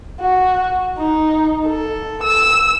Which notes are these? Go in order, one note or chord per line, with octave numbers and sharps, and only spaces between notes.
F#4
D#4
A4
E6